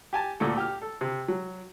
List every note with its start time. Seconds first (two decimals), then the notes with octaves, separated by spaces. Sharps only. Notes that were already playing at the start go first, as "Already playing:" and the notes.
0.13 G4 G#5 A5
0.40 D2 A#2 A3 A4
0.57 G4 F6
0.82 A4
1.01 C3
1.28 F#3